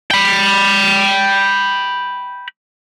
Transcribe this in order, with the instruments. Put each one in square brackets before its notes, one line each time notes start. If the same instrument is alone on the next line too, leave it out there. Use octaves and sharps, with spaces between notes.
[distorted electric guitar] G5 B5